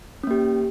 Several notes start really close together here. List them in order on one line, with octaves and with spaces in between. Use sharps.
C#4 A#3 G4